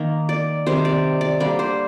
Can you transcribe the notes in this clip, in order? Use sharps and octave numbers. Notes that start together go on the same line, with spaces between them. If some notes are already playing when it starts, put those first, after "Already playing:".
Already playing: D#3 A#3
D5
C3 D#3 G3 C5
D5
D5
D3 G3 A#3 D5
C5